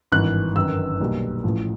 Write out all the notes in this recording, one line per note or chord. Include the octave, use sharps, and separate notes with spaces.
G#1 G2 E3 F#6
G1 F#2 D#3 E6
B1 A#2 G3
A1 A2 F3